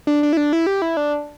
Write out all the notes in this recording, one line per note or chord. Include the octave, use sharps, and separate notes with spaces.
D4
D4
E4
D4
E4
G4
E4
D4